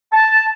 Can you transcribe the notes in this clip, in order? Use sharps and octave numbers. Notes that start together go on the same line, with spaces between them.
A5